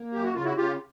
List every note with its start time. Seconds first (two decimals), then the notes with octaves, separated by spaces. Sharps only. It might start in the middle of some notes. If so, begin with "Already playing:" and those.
Already playing: A#3
0.13 F#2 G4
0.24 F#4
0.34 C#3 F4
0.44 E4 F#4
0.57 C#3 F4 G4